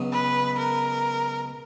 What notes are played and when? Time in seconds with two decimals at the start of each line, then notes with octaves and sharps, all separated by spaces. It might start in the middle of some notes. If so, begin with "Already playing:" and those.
Already playing: C#2 C#3 F#3 B3
0.12 B4
0.58 A#4